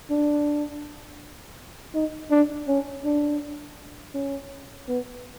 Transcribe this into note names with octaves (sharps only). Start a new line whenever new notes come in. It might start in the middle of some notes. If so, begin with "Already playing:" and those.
D4
D#4
D4
C#4
D4
C#4
B3